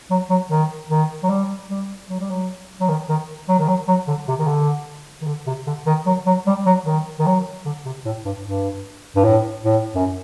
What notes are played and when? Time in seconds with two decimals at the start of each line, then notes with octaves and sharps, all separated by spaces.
0.11 F#3
0.30 F#3
0.50 D#3
0.90 D#3
1.23 F#3
1.29 G3
1.70 G3
2.09 F#3
2.20 G3
2.30 F#3
2.80 F#3
2.89 D#3
3.09 D#3
3.49 F#3
3.59 D#3
3.68 F#3
3.88 F#3
4.08 D3
4.28 C3
4.39 D#3
4.47 D3
5.22 D#3
5.27 D3
5.46 C3
5.67 D3
5.86 D#3
6.06 F#3
6.26 F#3
6.47 G3
6.66 F#3
6.85 D#3
7.19 D#3
7.26 F#3
7.65 D3
7.85 C3
8.05 A2
8.25 G2
8.45 G2
9.16 G2
9.24 A2
9.64 A2
9.95 F#2